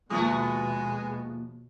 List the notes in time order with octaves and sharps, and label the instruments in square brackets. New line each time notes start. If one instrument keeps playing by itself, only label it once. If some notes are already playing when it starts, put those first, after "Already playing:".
[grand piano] D#2 F3 D#6 [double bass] B2 [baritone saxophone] G#3 [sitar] A3 B3 F#4